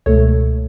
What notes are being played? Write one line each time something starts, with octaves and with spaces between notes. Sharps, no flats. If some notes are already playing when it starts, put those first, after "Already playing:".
C#2 B2 A3 A4 C#5